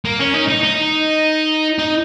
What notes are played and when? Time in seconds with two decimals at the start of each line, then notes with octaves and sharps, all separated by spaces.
0.05 A#3
0.20 C#4
0.34 D#4
0.49 D#4
0.63 D#4
1.79 D#4